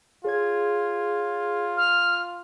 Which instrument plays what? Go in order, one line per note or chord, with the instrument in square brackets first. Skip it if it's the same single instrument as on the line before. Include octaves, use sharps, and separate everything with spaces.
[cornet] F4 [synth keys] G#4 C#5 G#6
[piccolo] F6